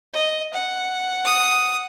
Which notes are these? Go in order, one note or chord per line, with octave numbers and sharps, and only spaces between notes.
D#5
F#5
D#6